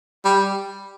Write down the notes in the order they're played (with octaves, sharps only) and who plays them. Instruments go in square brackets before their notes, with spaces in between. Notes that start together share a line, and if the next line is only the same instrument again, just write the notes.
[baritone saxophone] G3